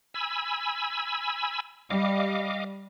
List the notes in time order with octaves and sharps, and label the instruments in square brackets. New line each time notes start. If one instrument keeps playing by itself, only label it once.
[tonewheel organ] G#5 B5 E6
[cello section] G3 [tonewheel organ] D#5 F5 D6